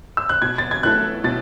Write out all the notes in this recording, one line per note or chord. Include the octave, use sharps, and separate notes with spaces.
E6
F#6
B2 G#6
A6
G#6
A3 E4 A4 F#6
B2 A6